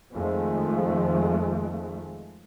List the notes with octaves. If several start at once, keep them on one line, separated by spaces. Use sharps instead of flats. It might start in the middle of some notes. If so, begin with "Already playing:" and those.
F2 D#3 F3 G#3 A3